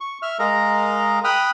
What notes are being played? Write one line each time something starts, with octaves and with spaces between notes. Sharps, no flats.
C#6
E5 F6
G#3 A#4 D#5 F5 A#5
G5 B5 D#6 F6 F#6